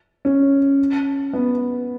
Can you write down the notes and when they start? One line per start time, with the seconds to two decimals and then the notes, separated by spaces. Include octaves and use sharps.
0.25 C#4
1.33 B3